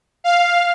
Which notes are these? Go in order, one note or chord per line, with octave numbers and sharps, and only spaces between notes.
F5